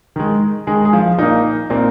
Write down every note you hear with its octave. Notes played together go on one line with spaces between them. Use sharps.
D#3 G#3
D#3 G#3 G#4
G#4
F3 F4
A#2 A#3 D#4
A#2 A#3 C4